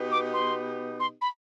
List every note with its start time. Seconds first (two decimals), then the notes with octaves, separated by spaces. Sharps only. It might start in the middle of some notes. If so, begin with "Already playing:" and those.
Already playing: B2 B3 D#4 G4 B4
0.12 D6
0.33 C6
1.00 C6
1.21 B5